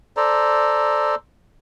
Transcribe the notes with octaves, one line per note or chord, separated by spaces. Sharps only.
A4 C5 D5 A#5